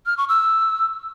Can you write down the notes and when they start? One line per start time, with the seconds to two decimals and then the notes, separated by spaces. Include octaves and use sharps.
0.06 F6
0.17 C#6
0.29 E6